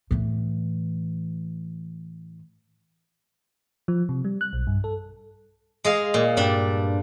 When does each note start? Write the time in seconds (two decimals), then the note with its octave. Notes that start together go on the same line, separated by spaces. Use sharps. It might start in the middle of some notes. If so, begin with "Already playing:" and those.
0.11 A2 E3
3.88 F3
4.09 C3
4.24 G3
4.41 F#6
4.53 B1
4.67 G2
4.84 A4
5.84 G#3 G#4 D#5 F5
6.14 A#2
6.37 G2 G3 D4 G5